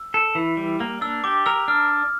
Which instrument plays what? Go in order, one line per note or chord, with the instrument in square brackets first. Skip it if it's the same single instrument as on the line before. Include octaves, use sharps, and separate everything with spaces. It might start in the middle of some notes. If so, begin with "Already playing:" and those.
Already playing: [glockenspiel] E6
[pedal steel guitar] A4
E3
G3
A#3
[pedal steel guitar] D4 [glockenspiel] E6
[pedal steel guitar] G4 [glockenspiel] D6
[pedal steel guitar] A#4 [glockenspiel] E6
[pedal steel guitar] D4 [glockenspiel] F6